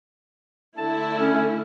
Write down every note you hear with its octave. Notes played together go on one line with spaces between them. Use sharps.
D3 A3 E4 A5
C#4